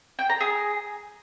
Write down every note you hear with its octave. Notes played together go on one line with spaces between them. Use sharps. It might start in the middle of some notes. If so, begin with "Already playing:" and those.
G5
A#5
G#4